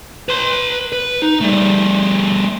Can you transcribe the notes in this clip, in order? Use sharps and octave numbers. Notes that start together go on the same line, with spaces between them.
B4 C6
B4
D#4
G3 A3